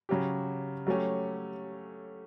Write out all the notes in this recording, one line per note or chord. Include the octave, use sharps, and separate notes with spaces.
C#3 F#3 C#4 G4
F#3 A3 C#4 G4